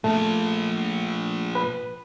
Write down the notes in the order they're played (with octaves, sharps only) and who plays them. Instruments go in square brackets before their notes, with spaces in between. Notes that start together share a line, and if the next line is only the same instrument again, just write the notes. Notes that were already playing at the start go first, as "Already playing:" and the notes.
[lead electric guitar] A#2 F3 [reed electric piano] A3
[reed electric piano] B4